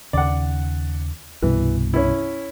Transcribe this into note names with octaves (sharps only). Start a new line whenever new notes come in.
D#2 C#3 D5 F#5
C2 G2 B2 E3
C#4 E4